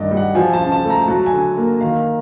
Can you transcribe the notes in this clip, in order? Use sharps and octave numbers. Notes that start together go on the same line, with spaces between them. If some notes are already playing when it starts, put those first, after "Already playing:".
Already playing: G2 D#3 D5 D#5
G3
F#5
F3 G#5
A5
C#3
A5
A3
A#5
F#3 A5
G#5
D3
A#3
D#3 F5